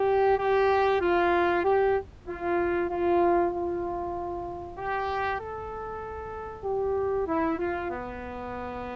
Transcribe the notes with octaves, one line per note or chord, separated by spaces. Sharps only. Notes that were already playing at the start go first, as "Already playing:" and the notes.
Already playing: G4
G4
F4
G4
F4
F4
F4
G4
A4
G4
E4
F4
B3